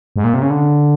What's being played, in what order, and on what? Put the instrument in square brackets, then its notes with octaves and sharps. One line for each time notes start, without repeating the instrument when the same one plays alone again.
[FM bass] G#2
A#2
C3
C#3
D3